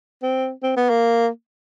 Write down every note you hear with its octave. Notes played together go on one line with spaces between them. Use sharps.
C4
C4
B3
A#3